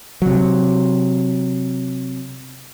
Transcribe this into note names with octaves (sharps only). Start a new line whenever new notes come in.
C3 F#3